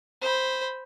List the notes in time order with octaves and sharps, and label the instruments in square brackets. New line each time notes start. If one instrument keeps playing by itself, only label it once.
[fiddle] C5 B5